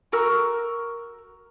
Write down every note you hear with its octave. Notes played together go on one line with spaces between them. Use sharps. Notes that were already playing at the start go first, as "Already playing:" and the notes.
F#4 A#4 E6